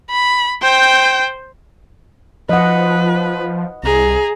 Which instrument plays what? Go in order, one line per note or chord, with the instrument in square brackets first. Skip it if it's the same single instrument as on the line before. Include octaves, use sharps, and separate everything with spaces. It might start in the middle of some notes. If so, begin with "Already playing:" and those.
[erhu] B5
[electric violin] C5 G6 [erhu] G5
[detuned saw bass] F3 [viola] B4 [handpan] D#5 F#5
[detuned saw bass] C2 [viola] G#4 A#5